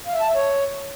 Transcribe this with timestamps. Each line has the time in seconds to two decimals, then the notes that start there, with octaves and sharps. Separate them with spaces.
0.06 F5
0.14 E5
0.21 A5
0.28 E5
0.35 C#5